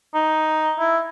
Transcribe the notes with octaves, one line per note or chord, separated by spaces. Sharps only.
D#4
E4